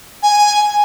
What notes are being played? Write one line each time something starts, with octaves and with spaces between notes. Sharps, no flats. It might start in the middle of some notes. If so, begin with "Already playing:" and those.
G#5